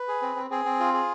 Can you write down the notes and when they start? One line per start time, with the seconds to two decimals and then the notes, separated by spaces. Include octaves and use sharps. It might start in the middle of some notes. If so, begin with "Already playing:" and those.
Already playing: B4
0.08 G#4
0.22 C4
0.36 C4
0.50 C4 G#4
0.65 C4
0.80 F4
0.94 G#4